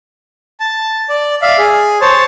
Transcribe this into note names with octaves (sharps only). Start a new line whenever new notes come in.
A5
D5
D5 E5 F5
G#4
C5 C#5 A5